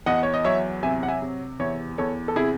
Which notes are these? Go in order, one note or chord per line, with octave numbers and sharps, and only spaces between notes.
E2 D#5 F#5
C#5
D#5
F#3 C#5 E5
C3 E5 G#5
F#5
E5 G#5
C3
E2 C#5 E5
E2 A4 C#5
A4
C3 E4 G#4